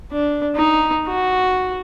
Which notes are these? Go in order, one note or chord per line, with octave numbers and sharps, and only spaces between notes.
D4
D#4
F#4